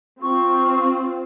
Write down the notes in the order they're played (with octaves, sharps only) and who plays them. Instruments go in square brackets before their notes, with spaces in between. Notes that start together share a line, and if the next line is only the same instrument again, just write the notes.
[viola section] C4 F4 [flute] C#6